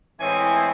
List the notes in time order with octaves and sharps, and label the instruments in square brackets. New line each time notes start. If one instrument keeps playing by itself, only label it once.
[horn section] A2 E3 G#3 C4 E4 G#5